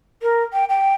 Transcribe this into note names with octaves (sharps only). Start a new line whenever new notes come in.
A#4
G5
G5